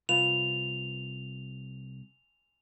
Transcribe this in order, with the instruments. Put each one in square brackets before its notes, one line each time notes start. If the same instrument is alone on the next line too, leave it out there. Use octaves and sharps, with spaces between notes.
[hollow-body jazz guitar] C2 F4 B4 [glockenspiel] F7